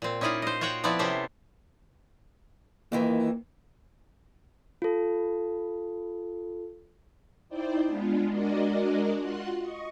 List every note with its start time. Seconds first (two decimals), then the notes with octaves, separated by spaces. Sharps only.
0.02 A#2 C4
0.21 C#4 D#4 E4 D5 D#5 F5
0.42 C5 D#5
0.61 F4 F#4 C#5 F#5 G5
0.84 F3 B3 C4 E4 D5
0.99 C3 B3 C#4 G4 A4 C5
2.92 F2 D#3 E3 A#3
4.82 F4 A4
7.49 D#4 E4 C5 D5 G5
7.86 G#3 B3 D4 F4
8.28 G#3 D4 F#4 A#4 D5 D#5
9.17 F4 F#4 F#5 C6
9.60 D#5 C#6